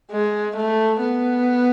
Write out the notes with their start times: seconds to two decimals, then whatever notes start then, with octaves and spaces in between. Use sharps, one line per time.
0.12 G#3
0.56 A3
1.01 B3